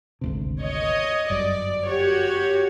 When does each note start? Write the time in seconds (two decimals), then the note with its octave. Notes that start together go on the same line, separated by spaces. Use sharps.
0.21 G#1 D2 C3
0.61 C#5 D#5
1.30 G1 F#2 D5
1.88 F#4 G4 C#5